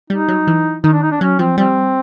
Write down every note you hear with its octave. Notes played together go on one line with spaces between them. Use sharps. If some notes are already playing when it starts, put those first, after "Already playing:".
G3 D#4
F#3
E3
D#3 D#4
D4
D#4
D4
F#3 C#4
F3 C4
G3 C4